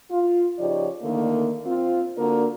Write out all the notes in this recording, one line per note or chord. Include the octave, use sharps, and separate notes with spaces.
F4
C#3 F3 D#4 G4 C#5 D5
D3 D#3 A3 A#3
C4 F4
D3 A#3 D4 F#4 A#4